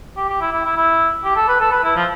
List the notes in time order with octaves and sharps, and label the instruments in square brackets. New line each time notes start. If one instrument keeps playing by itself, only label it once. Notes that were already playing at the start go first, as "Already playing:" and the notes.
[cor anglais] G4
G4
E4
E4
E4
E4
G4
A4
B4
A4
B4
E4
F3